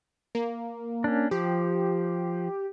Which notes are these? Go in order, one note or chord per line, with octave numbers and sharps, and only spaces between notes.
A#3
C#4 D4
F3 G4